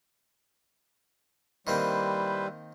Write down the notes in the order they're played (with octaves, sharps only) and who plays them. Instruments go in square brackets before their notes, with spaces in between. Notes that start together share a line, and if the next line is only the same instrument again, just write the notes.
[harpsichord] D#3 A#3 C4 [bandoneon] G3 [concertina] E4 B4 C5